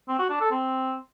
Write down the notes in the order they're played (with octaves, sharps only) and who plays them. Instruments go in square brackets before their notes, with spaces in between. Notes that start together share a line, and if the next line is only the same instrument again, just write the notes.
[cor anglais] C4
F#4
D4
A4
C4